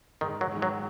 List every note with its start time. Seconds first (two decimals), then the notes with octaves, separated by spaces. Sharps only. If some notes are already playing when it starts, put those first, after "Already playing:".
0.21 G#2 D#3
0.41 F#3
0.51 D#3 G#3
0.62 F#3